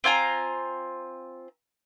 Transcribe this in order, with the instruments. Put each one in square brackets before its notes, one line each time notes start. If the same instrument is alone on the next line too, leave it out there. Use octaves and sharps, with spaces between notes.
[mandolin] C4 F4 G#5 A#5